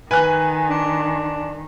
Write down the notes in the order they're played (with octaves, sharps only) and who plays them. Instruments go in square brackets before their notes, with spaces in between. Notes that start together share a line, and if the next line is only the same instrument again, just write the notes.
[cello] D#3 [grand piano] B4 [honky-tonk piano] G#5 F#6
[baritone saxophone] D4